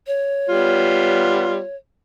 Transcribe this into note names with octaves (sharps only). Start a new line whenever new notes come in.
C#5
G3 B3 F4